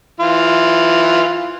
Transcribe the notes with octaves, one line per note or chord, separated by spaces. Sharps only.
E3 F4